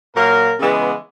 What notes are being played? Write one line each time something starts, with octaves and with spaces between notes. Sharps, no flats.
A#2 F#3 A#3 A#4
C#3 E3 G#3 B3